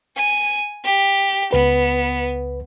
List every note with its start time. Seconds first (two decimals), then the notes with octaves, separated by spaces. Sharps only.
0.16 G#5
0.84 G4
1.52 C#2 B3 B4